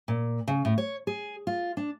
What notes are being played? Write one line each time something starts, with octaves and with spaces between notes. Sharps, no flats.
A#2
C#3
A2
C#5
G#4
F4
D4